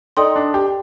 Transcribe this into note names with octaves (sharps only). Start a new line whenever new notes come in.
D#4 A4 D5 G5 C6 D#6
D4
G4